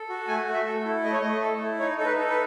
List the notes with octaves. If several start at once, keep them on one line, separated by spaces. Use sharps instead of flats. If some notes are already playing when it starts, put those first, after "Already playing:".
Already playing: A4
F#4
A3 G#5
A3
E5
A4
E4
A3 D#5
C#5
A3 D#5
A4
E4
D#4 C#5
D#4 A4
B4
A4
B4